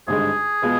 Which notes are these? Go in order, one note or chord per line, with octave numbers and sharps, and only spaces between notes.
G#1 G2 D3 G#3 G#4
B2 G#3 B3 F4